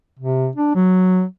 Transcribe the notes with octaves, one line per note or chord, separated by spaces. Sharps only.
C3
D4
F#3